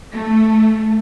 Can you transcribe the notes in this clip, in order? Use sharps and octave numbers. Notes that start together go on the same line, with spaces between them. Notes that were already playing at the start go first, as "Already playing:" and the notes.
A3